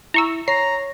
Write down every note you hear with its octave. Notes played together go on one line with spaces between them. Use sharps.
E4 A#5 C#6 E6
C#5 A#5 C7